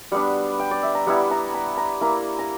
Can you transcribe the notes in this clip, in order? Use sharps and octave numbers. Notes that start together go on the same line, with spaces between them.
G3 B3 D4 F#5
G5
D5
E5
A#5
G3 B3 E4 F#5
A#5
B5
A#5
A#3 E4 A#5
A#5